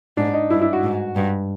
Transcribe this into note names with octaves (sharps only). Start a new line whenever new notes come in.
G#2 D4
D#4
G2 E4
E4
F#4
G#2
G2